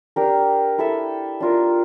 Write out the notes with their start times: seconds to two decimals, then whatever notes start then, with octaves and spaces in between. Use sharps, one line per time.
0.16 D4 G4 A#4
0.78 E4 A4 E5
1.40 D4 F4 A#4